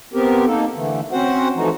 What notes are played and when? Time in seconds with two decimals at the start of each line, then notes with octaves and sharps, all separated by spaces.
0.13 B3 C4 G4 A#4
0.46 A#3 D#4 A4
0.75 D3 E3 A3
1.12 C4 C#4 F#4 C5 F#5
1.56 E3 F3 A3 D#4 F#4